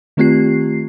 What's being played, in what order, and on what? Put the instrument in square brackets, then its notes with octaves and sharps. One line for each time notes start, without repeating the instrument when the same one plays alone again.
[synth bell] D#3 A3 C4 F4 G4 C7